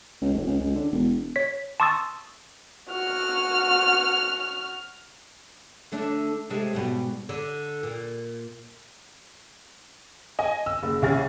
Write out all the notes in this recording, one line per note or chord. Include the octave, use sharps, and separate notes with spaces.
C#2
F1
C#2
C#2
D3
E1
C#5 B6
A5 C6 C#6 D#6 E6 A6
F#4 F6
D3 A3 D4
C3 G#3 A3
G#2 B2 G3
D3
A#2
D#5 G#5
E6
F#1
C2 C#3 C#4 G#4 F6 A6